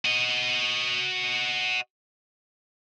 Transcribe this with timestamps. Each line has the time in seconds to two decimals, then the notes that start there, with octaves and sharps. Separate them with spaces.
0.05 F#4 D#5